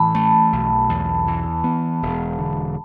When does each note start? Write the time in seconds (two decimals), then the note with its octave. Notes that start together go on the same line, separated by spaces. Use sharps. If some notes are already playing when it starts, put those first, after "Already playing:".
Already playing: A2 E3 A5 B5
0.15 A3 A5
0.53 B1
0.89 E2
1.27 E3
1.64 B3
2.02 E1
2.39 D3